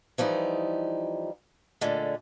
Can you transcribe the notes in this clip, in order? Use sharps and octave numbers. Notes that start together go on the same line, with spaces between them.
E3 F3 G3 D#4
A#2 D3 G#3 A3